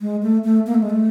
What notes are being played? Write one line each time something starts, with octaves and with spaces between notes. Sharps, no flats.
G#3
A3
A3
A#3
A3
G#3
A3